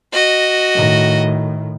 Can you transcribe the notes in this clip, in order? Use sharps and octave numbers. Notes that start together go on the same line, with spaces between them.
F#4 D#5
A2 D#3